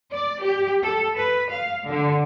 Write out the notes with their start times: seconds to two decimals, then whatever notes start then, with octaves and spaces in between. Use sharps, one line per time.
0.11 D5
0.43 G4
0.83 A4
1.17 B4
1.51 F5
1.86 D3